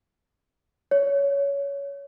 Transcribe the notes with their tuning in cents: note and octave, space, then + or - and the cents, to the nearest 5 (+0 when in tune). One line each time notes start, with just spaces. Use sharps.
C#5 +15